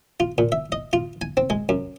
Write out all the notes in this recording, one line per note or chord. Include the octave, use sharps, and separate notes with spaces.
F4
A#2
E5
D#5
F4
G#5
C4
G#3
F#2